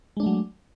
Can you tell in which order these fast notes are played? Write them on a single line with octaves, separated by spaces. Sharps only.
G#3 D4 A3 F#3